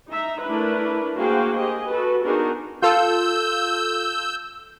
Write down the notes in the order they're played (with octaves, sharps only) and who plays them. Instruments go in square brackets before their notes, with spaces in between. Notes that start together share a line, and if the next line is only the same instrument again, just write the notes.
[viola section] D#4 E5 A#5
A3 D4 E4 A#4 B4
A#3 F#4 G#4 C5 F5 G5
G4 G#4 D#5
F#4 A4 B4
B3 D4 D#4 F#4 G#4 A#4
[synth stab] F4 A4 [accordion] E6 G6